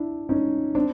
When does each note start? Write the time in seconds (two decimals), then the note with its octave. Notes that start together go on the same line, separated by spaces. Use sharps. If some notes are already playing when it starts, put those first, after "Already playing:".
Already playing: D4 E4
0.29 C#4 D#4
0.75 C4 D4